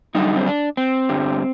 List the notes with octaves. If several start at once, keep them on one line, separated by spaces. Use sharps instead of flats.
F#2 D3 G3 D#4
C4
D4
C4
G2 D3 G3